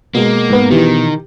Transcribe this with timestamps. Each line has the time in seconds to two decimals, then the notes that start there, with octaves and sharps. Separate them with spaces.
0.15 B2 G#3 A#3
0.50 G#2 B3
0.71 B2 D#3 E3 G4